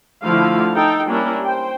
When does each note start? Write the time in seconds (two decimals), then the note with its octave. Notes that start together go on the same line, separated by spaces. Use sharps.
0.23 D3 F3 A3 E4 F5
0.75 D#4 A4 G5
1.08 G3 A#3 C#4 D4 E4
1.44 C5 G5